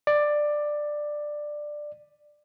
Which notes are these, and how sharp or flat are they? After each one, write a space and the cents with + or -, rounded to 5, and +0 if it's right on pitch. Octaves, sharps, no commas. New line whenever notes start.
D5 +10